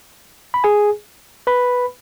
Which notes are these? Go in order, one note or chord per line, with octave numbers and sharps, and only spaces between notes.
B5
G#4 G#5
B4 B5